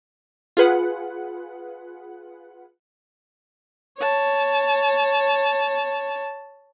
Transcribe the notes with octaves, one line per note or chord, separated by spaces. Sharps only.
F4 G#4 B4 F#5
C#5 A5